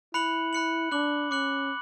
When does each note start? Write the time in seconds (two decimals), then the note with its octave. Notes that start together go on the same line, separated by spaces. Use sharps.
0.14 E4 B5 F#6 C#7 F#7
0.53 B5 F#6 C#7 F#7
0.92 D4 D6 F#6 C#7 F#7
1.31 C#4 D6 F#6 C#7 F#7